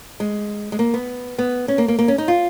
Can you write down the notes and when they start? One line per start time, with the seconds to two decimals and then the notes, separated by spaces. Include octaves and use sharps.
0.20 G#3
0.72 G#3
0.79 A#3
0.94 B3
1.38 B3
1.68 C#4
1.78 A#3
1.88 A#3
1.99 A#3
2.08 C#4
2.18 D#4
2.28 F4